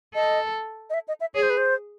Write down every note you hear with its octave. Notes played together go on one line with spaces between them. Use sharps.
A4 D#5
D#5
E5
D#5
E5
G#4 C#5
C5
B4
C5